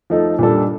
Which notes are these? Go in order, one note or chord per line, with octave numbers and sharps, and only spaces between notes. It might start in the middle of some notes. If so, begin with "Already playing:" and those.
F3 A3 D#4 A4
A#2 G3 D4 A4